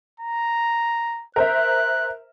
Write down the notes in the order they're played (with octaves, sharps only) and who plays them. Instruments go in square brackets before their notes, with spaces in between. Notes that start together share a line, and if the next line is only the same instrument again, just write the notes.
[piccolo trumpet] A#5
[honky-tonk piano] A#4 C5 E5 [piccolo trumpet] F#6